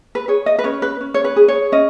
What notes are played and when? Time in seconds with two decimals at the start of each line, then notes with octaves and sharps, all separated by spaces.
0.15 B4
0.28 G#4 C#5
0.46 D#5
0.59 B4
0.64 C#4 C#5
0.82 B4
1.01 C#4
1.14 C#5
1.24 B4
1.36 G#4
1.48 C#5
1.72 C#4 D#5